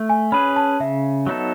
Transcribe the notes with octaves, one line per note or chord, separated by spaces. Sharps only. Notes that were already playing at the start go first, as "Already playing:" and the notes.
Already playing: A3
G#5
C#4 G#4 B4 B5
A5
C#3 E5
F#3 B3 D#4 A4